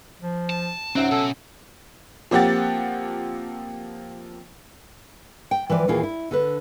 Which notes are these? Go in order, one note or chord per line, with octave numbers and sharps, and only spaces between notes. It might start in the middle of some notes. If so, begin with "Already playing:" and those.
F3
A5
G#2 F#3 C4 C#4 E5 F#5
B2 A4
F3 A#3 C4 G4 F#5 A6
G5
E3 F3 B4 D5
D#2 A#2 E3 A#3 F4 G#4
E4
D3 A4 B4